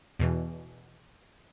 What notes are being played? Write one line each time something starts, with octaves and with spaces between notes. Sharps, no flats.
E2 B2 E3